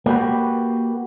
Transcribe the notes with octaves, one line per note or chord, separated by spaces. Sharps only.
A#3 F#4 G4 B4